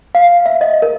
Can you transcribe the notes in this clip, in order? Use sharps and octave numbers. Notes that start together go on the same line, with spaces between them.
F5
E5
D#5
A#4